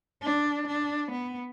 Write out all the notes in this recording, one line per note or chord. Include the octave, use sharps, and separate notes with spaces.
D4
D4
B3